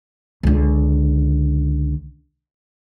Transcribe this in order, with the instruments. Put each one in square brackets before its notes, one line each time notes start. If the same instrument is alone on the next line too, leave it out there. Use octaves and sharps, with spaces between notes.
[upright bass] C#2 D3